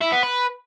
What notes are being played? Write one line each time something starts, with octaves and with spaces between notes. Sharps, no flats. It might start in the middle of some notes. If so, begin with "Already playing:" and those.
E4
B3
B4